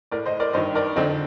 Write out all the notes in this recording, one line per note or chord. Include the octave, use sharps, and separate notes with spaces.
A2 A#4 D5
C5 D#5
A#4 D5
G2 D#3 C5 D#5
A#4 D5
F2 D3 C4 D#4